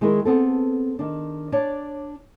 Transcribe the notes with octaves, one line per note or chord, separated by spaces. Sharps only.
D#3 G#3 E4 G#4 A#4
B3 C4 A4
D#3 D4
D4 C#5 D5